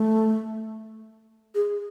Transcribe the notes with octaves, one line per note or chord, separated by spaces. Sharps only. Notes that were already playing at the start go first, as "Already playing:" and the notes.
Already playing: A3
G#4